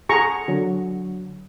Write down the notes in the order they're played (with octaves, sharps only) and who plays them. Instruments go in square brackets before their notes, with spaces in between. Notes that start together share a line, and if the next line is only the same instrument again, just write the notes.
[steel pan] G#4 A#5 C#6 [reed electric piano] A4 F#5
[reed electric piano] D3 F#3